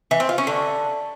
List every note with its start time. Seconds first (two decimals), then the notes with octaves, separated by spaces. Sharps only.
0.11 E3
0.20 C4
0.29 F4
0.38 C#4
0.47 D3